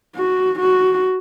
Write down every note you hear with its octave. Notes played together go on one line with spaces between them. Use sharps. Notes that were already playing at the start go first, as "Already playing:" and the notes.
F#4
F#4